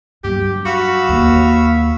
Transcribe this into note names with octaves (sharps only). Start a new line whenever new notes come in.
G2 F#3 G4
F#4 F5 B5 E6
D#2